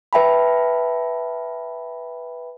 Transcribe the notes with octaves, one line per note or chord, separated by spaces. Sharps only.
B4 E5 G5 A5 B5